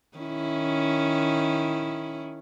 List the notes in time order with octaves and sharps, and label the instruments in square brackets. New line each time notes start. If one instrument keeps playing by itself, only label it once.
[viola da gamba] D#3 C#4 E4